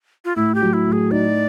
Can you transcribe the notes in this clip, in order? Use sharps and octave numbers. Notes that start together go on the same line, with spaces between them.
F4
A2 E4
G4
F#3
E4
A2
G#4
D#4 D5